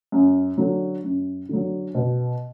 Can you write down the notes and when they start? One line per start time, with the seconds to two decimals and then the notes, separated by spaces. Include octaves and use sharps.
0.12 F#2
0.58 D3 F#3
1.04 F#2
1.49 D3 F#3
1.95 B2